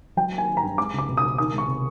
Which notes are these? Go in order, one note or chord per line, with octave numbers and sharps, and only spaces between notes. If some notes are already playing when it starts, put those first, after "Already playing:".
F#3 G5
A#3
G#5
D#3
A#5
G2
G#3 D6
C#2
D6
B2
D#6
C#2
D#3 D#6
G#3
C#6
C3